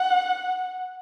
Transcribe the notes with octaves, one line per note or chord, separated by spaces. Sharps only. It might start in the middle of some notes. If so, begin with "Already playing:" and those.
Already playing: F#5